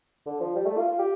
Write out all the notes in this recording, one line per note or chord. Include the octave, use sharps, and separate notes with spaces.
D3
F3
G3
A3
F4
F4
G4